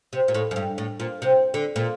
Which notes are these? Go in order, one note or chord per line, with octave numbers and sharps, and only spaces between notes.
C3
A#2
A2
F#2
G2
A2
A#2
C3
D3
A#2